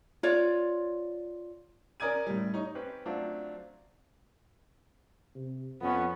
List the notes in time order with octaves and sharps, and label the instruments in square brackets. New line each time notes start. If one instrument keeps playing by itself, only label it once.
[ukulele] F4 C#5 D5
[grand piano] C#4 A#4 D5 D#6 G#6 D#7
A2 G3
D#4 C#5
[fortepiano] C4 C#4 G4 B4
F#3 A3 C4 D4 F4
[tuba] C3
[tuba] F2 [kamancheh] B3 C#4